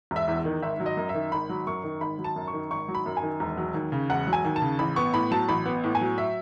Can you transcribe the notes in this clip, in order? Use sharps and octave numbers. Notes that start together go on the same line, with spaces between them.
E1 E5
E2
D#3
G#1 E5
F#3
D#5
F#2
E5
D#3
G#1 B5
F#3
F#2 C#6
D#3
G#1 B5
F#3
A5
F#2
C#6
D#3
G#1 C#6
F#3
B5
F#2
G#5
D#3
E1
F#3
D#2
C#3
E1 F#5
F#3
G#5
D#2
A5
C#3
A1 B5
B3 C#6
A2 B5
F#3 A5
A1 B5
B3
A2
G#5
F#3
E5